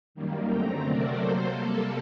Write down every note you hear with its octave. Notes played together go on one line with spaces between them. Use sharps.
F#2 D#3 G3 A#3
F#2 D3 A3 C4 G5 A#5
C3 F#3 A3 C4 A#4 D5
C3 F#3 A#3 A4 C5
C3 G3 A#3 A4